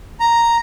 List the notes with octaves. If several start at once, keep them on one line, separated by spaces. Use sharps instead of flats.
A#5